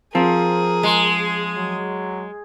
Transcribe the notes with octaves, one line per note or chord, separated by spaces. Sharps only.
F3 C4 G#4 A#4
G#3
F#3